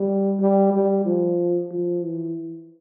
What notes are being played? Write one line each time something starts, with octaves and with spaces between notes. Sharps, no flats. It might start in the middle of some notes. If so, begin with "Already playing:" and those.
Already playing: G3
G3
G3
F3
F3
E3